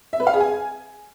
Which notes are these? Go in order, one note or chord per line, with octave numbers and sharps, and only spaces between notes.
E5
B4
F5
G#4
G#5